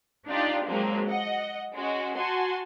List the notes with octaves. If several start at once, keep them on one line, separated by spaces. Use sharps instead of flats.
D4 D#4 F4 G4 D5
F3 F#3 G#3 A#3 C4
D#5 F#5
G#3 C#4 F#4
F#4 F#5 G#5 A5 C6